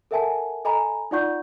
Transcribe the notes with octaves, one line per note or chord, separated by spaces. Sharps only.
A4 A#4 E5 F#5 G#5 A5
A4 D#5 G#5 A#5 B5
D#4 F4 D5 F#5 C#6 G6